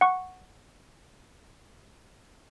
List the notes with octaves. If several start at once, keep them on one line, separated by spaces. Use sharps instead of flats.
F#5 C#6